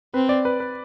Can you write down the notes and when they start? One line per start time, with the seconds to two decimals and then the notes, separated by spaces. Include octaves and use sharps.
0.14 C4 B4
0.29 D5
0.45 B4
0.60 B4